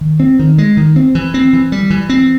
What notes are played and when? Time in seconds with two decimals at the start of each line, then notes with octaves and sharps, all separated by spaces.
0.01 D#3
0.20 C4
0.39 D#3
0.58 G#3
0.77 D#3
0.96 C4
1.15 E3
1.34 C4
1.53 E3
1.72 G3
1.90 E3
2.09 C4